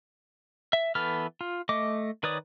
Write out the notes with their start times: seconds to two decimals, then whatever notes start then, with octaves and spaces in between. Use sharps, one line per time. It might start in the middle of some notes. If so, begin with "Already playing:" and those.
0.73 E5
0.95 E3 B3 A4 B4 F6
1.41 F4
1.69 A3 D#5 D6
2.23 D#3 B4 C#5 D5 D#6